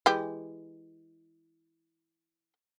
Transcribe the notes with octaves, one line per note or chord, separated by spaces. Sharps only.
E3 G#3 G4